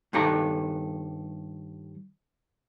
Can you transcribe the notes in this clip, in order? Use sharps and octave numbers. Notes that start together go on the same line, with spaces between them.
G2 D#3 A4 A#5